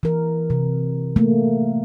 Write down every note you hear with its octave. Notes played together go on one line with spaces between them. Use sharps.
E3 A#4
C3
A3 A#3